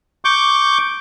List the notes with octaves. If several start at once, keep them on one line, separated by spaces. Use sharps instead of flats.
C#6 D6 G6